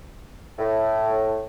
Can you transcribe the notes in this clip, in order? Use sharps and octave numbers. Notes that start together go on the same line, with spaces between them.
A2